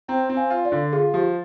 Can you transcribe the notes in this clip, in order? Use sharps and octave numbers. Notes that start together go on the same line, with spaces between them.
C4 G5 A#5
C4
F5 G#5
F4
D5 F5
D3
F4 G#4
F3 G4